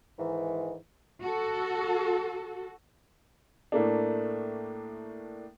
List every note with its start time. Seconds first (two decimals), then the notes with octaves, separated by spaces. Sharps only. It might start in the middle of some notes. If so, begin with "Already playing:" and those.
0.19 G#2 D#3 E3
1.22 F#4 A4
3.72 A2 A3 A#3 D4